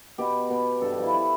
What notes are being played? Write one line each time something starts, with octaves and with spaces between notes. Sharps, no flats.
B2 G4
B2
G2 A4
G4
F3
E4
E4